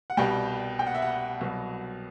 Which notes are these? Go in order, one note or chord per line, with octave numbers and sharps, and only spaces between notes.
F#5
C2 B2 G3 G5
G5
F#5
E5
F#5
C2 B2 F#3